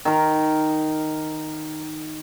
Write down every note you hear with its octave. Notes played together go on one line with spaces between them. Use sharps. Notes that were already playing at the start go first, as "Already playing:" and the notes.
D#3 A#4